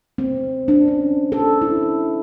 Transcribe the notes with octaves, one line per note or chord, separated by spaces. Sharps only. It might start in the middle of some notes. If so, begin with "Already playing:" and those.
C4
D4
C#4
A4
E4